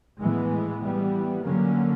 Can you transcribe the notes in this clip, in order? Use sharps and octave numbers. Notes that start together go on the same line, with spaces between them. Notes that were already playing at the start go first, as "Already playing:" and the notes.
A2 E3 G#3 B3
E3 G3 B3
D3 F#3 A#3 C#4